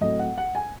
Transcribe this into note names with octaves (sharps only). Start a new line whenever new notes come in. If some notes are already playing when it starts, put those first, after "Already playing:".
A2 F#3 A3 C4 D#5
F#5
F#5
G#5